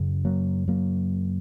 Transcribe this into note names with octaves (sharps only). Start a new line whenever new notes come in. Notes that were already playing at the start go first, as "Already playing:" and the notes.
Already playing: F#2 C#3
F#3 A#3
F#3 A#3